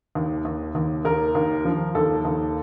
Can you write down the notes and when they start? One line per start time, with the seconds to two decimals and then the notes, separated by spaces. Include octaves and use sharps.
0.15 D#2
0.45 D#2
0.75 D#2
1.05 D#2 A#4
1.35 D#2
1.65 F3
1.95 D#2 A4
2.25 D#2